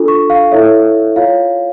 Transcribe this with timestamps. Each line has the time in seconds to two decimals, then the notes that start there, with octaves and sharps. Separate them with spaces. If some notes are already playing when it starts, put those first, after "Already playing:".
Already playing: D4 F4 A4
0.08 C#6
0.30 F5
0.52 E4 A4 C#5 E5
1.16 F4 C#5 F5